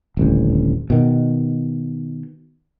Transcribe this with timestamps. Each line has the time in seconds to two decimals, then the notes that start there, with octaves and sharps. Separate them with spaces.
0.17 D#1 A1 D2
0.90 B2 D#3